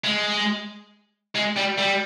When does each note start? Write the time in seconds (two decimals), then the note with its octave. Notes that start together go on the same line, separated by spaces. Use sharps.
0.04 G#3
1.35 G#3
1.56 G3
1.78 G3